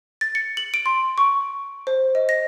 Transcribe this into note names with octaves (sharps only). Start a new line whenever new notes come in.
A6
C#7
F#7
D7
C6
C#6
C5
D#5
A#6